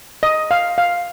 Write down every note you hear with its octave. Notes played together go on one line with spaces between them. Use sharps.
D#5
F5
F5